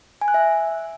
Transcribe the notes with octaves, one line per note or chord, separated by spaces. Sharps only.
G#5
F#6
E5